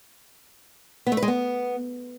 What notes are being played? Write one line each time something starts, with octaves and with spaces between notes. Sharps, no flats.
B3
A3
B4
G#3
B3